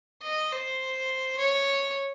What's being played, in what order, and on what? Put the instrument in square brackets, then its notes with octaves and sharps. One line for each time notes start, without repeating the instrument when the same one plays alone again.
[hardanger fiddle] D#5
C5
C#5